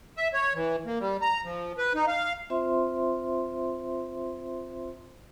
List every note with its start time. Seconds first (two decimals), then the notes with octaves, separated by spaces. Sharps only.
0.17 E5
0.34 C#5
0.54 E3
0.86 A#3
1.00 G3
1.22 A#5
1.44 F3
1.78 B4
1.95 D#4
2.07 F5
2.50 C4 F4 C5 E5 C6